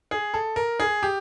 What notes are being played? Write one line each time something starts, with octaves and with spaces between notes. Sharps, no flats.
G#4
A4
A#4
G#4
G4